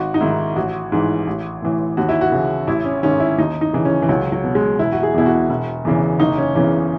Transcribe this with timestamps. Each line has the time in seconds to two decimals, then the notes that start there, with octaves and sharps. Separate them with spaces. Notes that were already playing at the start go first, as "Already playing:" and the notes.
Already playing: G#1 F#4
0.14 D#4
0.21 G#2 D#3 E4
0.56 A1 F#4
0.92 G#2 E3
1.27 A1
1.62 A2 E3
1.97 D#2 F#4
2.09 E4
2.21 F#4
2.32 C#3 E3
2.67 A1 E4
2.85 C#4
3.03 G#2 D#3 C#4
3.20 E4
3.38 D#2 D#4
3.61 D#4
3.73 C#3 E3
3.85 C#4
4.02 E3
4.09 C#2 F#3
4.32 F#3
4.44 B2
4.55 G#3
4.79 E1 E4
4.92 F#4
5.03 G#4
5.14 E2 B2 E4
5.26 F#4
5.49 E1
5.85 E2 C#3 E3
6.20 F#1 D#4
6.38 C#4
6.55 E2 C#3 E3 C#4